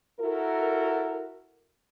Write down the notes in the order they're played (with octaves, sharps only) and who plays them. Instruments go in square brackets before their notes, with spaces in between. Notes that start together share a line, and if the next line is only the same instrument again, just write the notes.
[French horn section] E4 F#4 A4 A#4